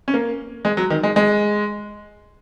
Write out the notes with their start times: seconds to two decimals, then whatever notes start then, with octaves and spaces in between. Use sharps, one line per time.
0.08 C#4
0.14 A#3
0.65 G#3
0.77 F#3
0.90 D#3
1.03 G#3
1.16 G#3